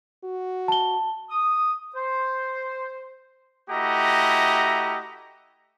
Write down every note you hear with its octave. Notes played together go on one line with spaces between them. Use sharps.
F#4
A5 G7
D#6
C5
A3 E4 F#4 G4 D#5 A#5